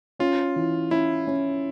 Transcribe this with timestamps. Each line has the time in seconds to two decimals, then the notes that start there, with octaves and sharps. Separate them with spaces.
0.19 C#4 F4
0.56 E3
0.91 C#4 E4
1.27 C#4